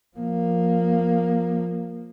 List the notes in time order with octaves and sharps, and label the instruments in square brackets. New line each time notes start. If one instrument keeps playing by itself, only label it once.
[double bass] F3 A#3